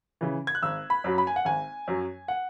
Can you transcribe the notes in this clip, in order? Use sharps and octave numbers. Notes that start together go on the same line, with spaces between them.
C#3 E3
G#6
F#6
G#1 E6
B5
F#2 F#3
B5
G#5
F#5
G#1 G#5
F#2 F#3
F#5